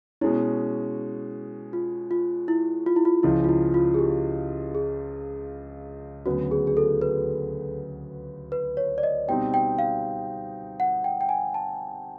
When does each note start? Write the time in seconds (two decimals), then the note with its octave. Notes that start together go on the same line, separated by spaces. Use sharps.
0.21 B2 G#3 C#4 E4
1.73 F4
2.11 F4
2.48 E4
2.86 F4
2.96 E4
3.05 F4
3.23 C#2 C#3 F3 E4
3.44 F4
3.49 E4
3.74 F4
3.94 G#4
3.99 G4
4.75 G#4
6.26 D2 C#3 F#3 B3 F#4
6.51 G#4
6.67 G#4
6.77 A4
7.02 B4
8.52 B4
8.77 C#5
8.98 D5
9.03 D#5
9.28 B2 G3 C4 D#4 G5
9.54 G5
9.78 F5
10.80 F#5
11.04 G5
11.21 G5
11.29 G#5
11.54 A5